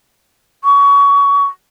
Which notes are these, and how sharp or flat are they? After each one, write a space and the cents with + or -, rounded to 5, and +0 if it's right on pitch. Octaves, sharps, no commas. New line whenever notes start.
C#6 +25